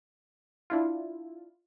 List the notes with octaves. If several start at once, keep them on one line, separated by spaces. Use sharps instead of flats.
D4 E4 F4